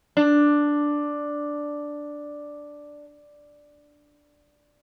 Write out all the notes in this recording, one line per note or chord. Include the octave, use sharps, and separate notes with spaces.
D4